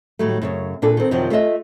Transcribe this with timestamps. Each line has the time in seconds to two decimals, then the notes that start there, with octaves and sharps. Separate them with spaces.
0.19 A2 D#3 F#3 G3 A3
0.42 F#2 A#2 C#3
0.82 A#2 D4 G#4 A4
0.97 D#3 C4
1.11 F#2 C3 D#3 F3 F#3
1.30 A3 F4 A4 C5 D#5 E5